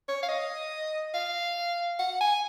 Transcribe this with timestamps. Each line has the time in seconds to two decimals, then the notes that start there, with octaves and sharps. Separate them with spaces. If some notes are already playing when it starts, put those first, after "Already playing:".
0.08 C#5
0.23 F5
0.28 D#5
1.14 F5
1.99 F#5
2.21 G#5